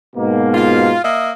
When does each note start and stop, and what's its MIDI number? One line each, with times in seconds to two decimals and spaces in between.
0.16 0.94 44
0.16 0.94 47
0.16 0.94 58
0.54 0.99 65
1.03 1.31 58
1.03 1.31 75
1.03 1.31 76